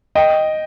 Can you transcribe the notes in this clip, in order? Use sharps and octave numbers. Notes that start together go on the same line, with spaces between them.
D#5 G5